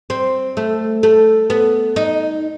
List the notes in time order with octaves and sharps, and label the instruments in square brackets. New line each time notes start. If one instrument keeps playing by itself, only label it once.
[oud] C4
A3
A3
B3
D#4